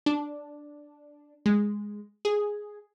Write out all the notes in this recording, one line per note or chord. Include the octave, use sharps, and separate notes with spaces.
D4
G#3
G#4